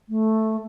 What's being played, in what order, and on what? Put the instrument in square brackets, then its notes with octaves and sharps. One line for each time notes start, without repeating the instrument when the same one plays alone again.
[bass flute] A3